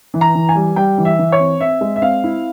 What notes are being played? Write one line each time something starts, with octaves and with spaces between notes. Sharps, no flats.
E3
A#5
E3
G#5
G3
G3 G5
E3
E5
E3
C#5
C4
C4 E5
G#3
E5
C4 F5
E4